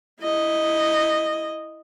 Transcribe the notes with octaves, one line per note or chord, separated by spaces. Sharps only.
E4 D#5